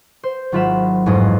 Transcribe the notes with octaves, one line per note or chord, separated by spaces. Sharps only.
C5
G#1 F#3 F4 E5 B5 E7
A1 F2 G#2 G#3 D#5